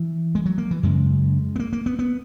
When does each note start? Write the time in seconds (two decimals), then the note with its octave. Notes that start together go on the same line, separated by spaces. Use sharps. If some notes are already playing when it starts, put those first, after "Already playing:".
Already playing: E3
0.35 G#3
0.46 F#3
0.58 A#3
0.71 E3
0.83 F#2 C#3 G#3
1.56 B3
1.60 A#3
1.73 A#3
1.86 B3
1.99 B3